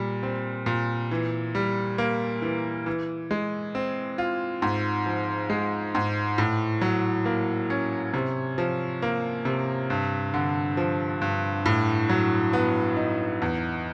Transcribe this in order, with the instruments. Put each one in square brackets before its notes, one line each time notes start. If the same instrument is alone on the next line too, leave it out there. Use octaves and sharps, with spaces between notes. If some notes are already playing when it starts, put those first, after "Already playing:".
Already playing: [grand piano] A#2 G3
C4
A#2
E3
G3
A#3
E3
E3
G#3
C4
F4
G#2
F3
G#3
G#2
A2
F#3
A#3
C#4
C3
F3
A#3
C3
G2
D3
F3
G2
A2
F#3
B3
D#4
E2